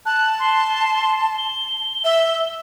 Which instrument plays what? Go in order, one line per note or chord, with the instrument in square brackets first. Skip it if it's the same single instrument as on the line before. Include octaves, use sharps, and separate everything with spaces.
[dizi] A5 [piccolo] F#6
[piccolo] C6
G7
[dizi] E5